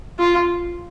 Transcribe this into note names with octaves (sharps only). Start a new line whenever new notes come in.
F4